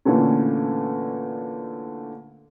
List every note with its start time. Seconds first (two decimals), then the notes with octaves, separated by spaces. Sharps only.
0.05 A#2 D3 E3 A3 C#4